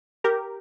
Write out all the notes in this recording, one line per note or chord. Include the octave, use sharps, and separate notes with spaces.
G4 A#4